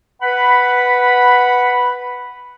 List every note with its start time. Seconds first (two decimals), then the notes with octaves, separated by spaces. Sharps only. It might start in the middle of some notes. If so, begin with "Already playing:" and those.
0.22 B4 F#5 B5